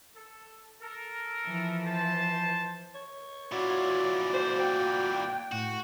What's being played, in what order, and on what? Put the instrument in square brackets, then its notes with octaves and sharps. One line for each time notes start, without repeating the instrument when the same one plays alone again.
[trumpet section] A4
A4 A#4
[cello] E3 F3
[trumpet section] C5 A5
[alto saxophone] C#5
[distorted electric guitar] A#2 E3 [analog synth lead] F#4 [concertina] D5
[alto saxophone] C5
G5
[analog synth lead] A2 [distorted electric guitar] F#4